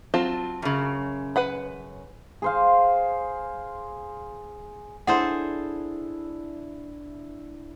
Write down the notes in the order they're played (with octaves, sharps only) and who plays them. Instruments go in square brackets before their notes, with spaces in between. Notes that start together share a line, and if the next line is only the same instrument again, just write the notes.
[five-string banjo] F#3 C4 F4 [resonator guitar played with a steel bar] A5
[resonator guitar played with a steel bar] F#2 C#3
[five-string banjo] B4 F#5 B5
[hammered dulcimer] G#4 C5 F5
[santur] D4 E4 [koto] G#4 A4 C5 [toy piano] F#5